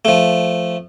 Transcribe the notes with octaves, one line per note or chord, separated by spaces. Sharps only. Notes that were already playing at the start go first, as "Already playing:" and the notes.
F3 A3